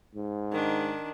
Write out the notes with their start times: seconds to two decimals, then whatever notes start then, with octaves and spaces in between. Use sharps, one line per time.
0.15 G#2
0.52 D#3 D4